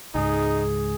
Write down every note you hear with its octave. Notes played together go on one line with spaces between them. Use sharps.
C#2 G#2 D#4 G#4